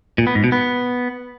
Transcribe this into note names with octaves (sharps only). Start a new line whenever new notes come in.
A#2
B3
G#2
B2
B3